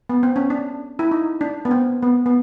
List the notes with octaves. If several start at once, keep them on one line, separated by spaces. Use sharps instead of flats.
B3
C4
C#4
D4
E4
D#4
D4
B3
C4
B3
B3